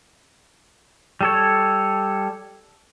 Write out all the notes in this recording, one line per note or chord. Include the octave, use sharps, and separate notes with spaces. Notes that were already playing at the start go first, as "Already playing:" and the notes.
G3 A4 C#5